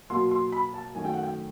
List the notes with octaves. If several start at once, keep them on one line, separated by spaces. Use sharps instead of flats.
B2 F#3 A#3 C6
C6
B5
A5
F#2 D#3 F#3 A3 G#5
G5
F#5
G5